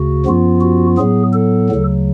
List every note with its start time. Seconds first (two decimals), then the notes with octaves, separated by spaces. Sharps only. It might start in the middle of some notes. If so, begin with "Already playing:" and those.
Already playing: D2 C#3 F#4
0.26 F#2 F3 B3 F4
0.61 F#4
0.98 A2 F#3 B3 G#4
1.33 A4
1.70 D2 C#3 F#3